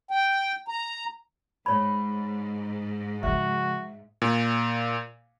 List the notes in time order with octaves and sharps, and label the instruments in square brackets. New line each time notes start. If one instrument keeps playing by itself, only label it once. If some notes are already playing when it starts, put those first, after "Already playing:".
[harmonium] G5
A#5
[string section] G#2 [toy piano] C#5 B5
[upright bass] C#3 F3 [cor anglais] F#4 [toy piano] E5
[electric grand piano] A#2